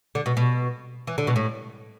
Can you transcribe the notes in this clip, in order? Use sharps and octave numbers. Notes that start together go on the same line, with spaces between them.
D3
B2
B2
E3
D3
B2
A2